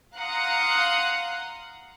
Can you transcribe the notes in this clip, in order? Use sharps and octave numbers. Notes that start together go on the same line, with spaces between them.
F5 F#5 A#5 C6 D#6 F#6